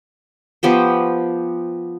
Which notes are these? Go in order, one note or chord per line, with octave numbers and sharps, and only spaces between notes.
F3 B3 G4 C5